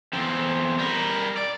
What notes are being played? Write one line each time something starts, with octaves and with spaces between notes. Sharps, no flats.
E2 C4
G3 A#4
D5